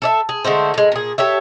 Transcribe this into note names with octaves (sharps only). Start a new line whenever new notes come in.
A4 D5 E5
G#4
D3 G#3 A3 C5
A2 G#3
A#2 G#4
G4 A4 C#5 E5